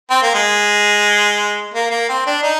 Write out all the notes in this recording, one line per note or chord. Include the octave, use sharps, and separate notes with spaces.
C4
A#3
G#3
A#3
A#3
C4
D4
D#4